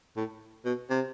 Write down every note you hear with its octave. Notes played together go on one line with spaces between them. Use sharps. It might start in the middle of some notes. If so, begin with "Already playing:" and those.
A2
B2
C3